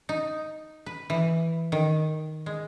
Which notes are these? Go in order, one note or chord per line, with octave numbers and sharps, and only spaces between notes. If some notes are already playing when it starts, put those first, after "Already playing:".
D#4
B4
E3
D#3
G#3